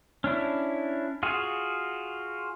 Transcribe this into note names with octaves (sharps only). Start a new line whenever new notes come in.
C#4 D4 E4
F4 F#4 G#4